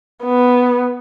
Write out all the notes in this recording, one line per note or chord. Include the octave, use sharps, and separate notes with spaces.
B3